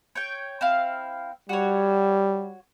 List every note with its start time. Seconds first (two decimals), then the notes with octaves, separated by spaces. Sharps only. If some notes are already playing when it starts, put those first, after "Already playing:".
0.15 C#5 G5
0.61 C4 E4 F5
1.49 G3 F#4 C#5